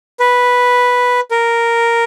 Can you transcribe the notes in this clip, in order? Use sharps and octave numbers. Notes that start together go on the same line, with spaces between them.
B4
A#4